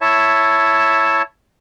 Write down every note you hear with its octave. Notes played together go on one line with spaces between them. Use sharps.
E4 C#5 E5 A5